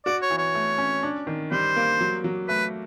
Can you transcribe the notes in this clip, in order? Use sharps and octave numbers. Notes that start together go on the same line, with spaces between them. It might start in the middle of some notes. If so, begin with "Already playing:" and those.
F#4 D5
C#5
E3
C#5
A3
C#4
D4
D#3
G3 C5
A#3
F#3
F#3
A3 B4